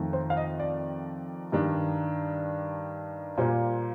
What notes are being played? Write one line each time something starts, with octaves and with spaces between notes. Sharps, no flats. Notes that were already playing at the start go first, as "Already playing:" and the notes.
Already playing: F2 D#3 A3
C5
F5
D#5
D5
G2 D#3 G3 D4
A#2 G3 A#3 C5